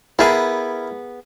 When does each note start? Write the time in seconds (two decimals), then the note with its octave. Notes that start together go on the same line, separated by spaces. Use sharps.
0.19 B3 E4 G#4 A#4 A5